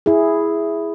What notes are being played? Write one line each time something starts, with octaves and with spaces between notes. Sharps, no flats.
E4 G#4